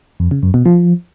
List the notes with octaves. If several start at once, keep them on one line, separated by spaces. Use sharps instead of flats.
F2
C#3
F#2
B2
F3